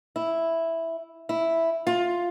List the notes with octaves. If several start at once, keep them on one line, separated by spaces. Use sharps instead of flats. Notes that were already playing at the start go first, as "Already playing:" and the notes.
E4
E4
F4